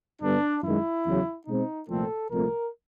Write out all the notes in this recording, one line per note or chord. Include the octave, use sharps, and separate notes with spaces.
G2 D3 G3 B3 D4
F#2 D#3 G#3 E4
E2 C#3 F#3
B2 G#3 C4 D#4
C2 A#2 F3 A3 C4 A4
C2 A#2 F3 A3 C4 A#4